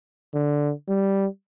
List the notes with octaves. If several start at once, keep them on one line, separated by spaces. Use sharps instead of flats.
D3
G3